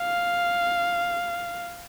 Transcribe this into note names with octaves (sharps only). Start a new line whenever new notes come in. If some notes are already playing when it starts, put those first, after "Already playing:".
Already playing: F5